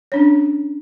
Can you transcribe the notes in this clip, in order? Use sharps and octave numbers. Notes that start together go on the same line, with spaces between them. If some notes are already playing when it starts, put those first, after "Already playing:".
C#4 D4 C#5